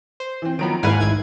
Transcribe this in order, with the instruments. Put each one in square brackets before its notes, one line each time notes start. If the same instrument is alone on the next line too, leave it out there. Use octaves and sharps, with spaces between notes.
[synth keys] C5
[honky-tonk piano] E3 C4
[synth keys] D#3 F#3 B3 [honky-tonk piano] F3 A#5 D7
[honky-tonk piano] D#2 E4 B4 [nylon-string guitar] G#2 [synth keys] F5 F#5 G#5
[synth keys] A1 E4 G#6 [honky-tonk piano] D#3